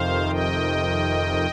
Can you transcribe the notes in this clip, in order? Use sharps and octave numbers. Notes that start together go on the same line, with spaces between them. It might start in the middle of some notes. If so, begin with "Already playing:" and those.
Already playing: F2 C3 D#3 C5 F5
D#5 G5